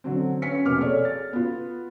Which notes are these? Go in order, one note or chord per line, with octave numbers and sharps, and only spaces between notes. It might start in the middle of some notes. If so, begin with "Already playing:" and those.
D3 F#3 C4
C#4 B4 B6 C#7
F1 B2 A#3 D6 F6
G#4 A4 C#5 D5
A6
B3 F4